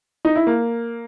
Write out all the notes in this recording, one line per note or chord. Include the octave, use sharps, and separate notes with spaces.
D#4
E4
A#3